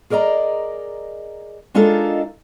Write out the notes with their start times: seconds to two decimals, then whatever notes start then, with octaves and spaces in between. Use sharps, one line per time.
0.10 G#4 A#4 D5 D#5 A#5
1.74 G#3 D4 D#4 F4 A4 A#4